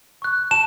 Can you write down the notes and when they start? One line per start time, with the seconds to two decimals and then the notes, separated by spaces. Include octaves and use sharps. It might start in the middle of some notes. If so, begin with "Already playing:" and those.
0.22 C#6 F#6
0.51 A5 E7